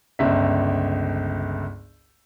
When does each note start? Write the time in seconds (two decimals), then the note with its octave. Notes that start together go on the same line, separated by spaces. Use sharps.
0.19 G1 C#2 E5